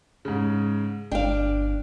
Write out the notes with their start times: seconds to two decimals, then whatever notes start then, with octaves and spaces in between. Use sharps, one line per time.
0.25 G#2 C#3
1.12 G1 D4 F5 G5